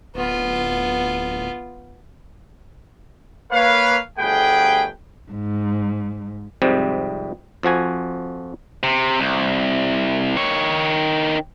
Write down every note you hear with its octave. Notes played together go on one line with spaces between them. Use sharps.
D1 B3 F4
A#3 B4 C#5 F5
G1 D2 A3 G#4 B4 G5
G#2
F2 G#2 C3 G3 C4
F2 F3 F#4 G#5
C3
C2
D#3 C#5